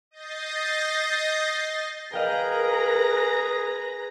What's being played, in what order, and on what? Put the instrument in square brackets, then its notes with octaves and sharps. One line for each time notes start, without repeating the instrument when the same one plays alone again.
[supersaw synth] D#5 G6 A6 A#6 C7
[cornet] G#4 [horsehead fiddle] A#4 [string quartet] B4 A#5 A#6 [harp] D#5 F5 G5